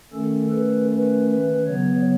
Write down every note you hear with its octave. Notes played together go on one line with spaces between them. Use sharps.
D#3 A3 C#4 A4
B4
B4
B4
C#3 F#3 B3 C#5